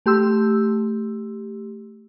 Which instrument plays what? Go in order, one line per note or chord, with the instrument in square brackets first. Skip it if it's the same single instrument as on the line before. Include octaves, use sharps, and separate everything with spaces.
[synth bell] A3 G4 C6 E6